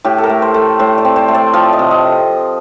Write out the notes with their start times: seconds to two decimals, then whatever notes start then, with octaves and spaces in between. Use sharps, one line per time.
0.04 A2 G4
0.18 A4
0.24 A#4
0.29 A3
0.42 C5
0.54 A3
0.79 A2 C5
0.98 D5
1.05 C4
1.16 C5
1.28 A3
1.35 D5
1.54 F3 F5
1.73 D#5
1.79 C3
1.91 D#5